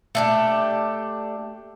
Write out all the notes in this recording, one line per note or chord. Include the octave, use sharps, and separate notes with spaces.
A3 D4 G4